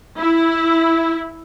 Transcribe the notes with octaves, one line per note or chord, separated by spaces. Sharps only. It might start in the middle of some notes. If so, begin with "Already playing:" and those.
E4